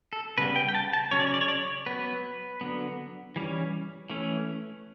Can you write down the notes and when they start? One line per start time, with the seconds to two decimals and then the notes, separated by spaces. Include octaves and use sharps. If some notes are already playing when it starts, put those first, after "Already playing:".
0.13 A4
0.38 C#3 G3 B3 B4
0.56 G5
0.69 G5
0.75 A5
0.93 A5
1.11 C#3 F#3 C#4 C#5
1.20 D5
1.27 C#5
1.34 D5
1.41 C#5
1.48 D5
1.55 C#5
1.86 F#3 B3 B4
2.61 D3 F#3 B3
3.36 E3 G3 C#4
4.10 E3 A3 C#4